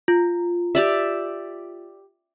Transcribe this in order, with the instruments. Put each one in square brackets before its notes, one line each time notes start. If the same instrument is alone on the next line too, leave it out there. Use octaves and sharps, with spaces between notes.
[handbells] F4
[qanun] G4 D5 E5